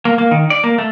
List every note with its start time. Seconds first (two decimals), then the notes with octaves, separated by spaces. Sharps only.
0.05 A#3
0.18 A#3
0.31 D#3
0.50 D5
0.64 A#3
0.78 A3